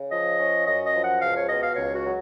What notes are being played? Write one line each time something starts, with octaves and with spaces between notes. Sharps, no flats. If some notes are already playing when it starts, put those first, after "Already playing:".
Already playing: C#3
F3 D#5
C#4
F#2 D#5
D#5
F3
F#5
C#2 F5
C#5
B2 D#5
F5
C#2 C#5
F#4
F#3